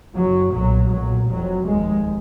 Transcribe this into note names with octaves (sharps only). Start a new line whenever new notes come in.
F#1 F#2 F#3
B1 A#2 F#3
B1 A#2 F#3
F1 F2 F#3
F1 D#2 G#3